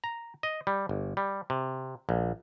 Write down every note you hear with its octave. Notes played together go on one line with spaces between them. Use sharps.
A#5
D#5
G3
G1
G3
C3
A#1